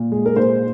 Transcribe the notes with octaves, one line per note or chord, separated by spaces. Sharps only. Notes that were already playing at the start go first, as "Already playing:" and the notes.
Already playing: A#2
G#3
A#4
A#2 C5